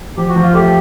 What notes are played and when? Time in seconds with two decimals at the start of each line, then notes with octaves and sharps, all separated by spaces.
0.17 F3 G4
0.29 F#4
0.36 F3
0.42 F4
0.54 A3 G4